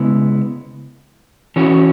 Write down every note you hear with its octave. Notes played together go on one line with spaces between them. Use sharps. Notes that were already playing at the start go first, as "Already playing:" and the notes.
Already playing: C#3 G#3 B3 E4
E3 C#4 F#4